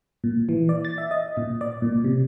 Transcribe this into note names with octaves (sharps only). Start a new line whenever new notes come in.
A#2
E3
D5
A6
E5
D#5
A#2
D5
A#2
C3